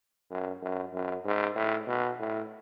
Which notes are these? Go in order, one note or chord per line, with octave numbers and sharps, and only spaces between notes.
F#2
F#2
F#2
G#2
A2
B2
A2